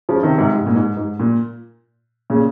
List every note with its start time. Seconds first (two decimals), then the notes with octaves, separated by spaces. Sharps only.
0.09 C#3 F3
0.23 C3 D#3
0.38 G#2 C3
0.53 G#2
0.66 A#2
0.75 G#2
0.97 G#2
1.20 A#2
2.30 A#2 C#3